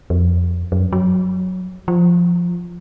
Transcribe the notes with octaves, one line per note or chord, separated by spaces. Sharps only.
F2
F#2
F#3
F3